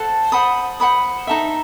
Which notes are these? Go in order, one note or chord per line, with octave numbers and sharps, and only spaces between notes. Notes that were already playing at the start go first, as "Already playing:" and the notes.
Already playing: A4 C5 F#5 A5
C5 F#5 B5 D#6
C5 F#5 B5 D#6
D#4 A4 E5